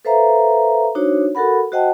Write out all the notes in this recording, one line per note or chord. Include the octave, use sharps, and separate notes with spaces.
A4 B4 C5 E5 F5 A#5
D4 D#4 F#4 C5 C#5
F#4 A4 A#4 F#5 B5
F#4 C5 D#5 F#5 G5 A5